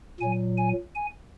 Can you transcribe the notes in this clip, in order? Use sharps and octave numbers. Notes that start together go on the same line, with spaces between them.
A#2 F#3 G#5
G#5
G#5